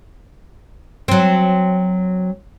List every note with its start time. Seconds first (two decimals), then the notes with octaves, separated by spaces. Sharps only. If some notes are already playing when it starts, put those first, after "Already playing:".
1.08 F#3 C4